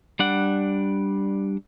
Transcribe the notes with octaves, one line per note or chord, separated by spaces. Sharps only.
G3 D4 F#5